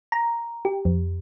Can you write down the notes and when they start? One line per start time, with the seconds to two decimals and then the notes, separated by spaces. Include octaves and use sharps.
0.12 A#5
0.65 G4
0.85 F2